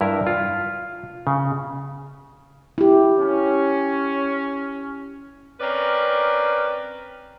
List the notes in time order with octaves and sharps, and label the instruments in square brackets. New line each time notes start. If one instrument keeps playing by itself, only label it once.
[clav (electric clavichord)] G2 E4 A#4
F4
C#3
[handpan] E4 G4
[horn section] C#4
[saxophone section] C4 C#4 A#4 B4 D5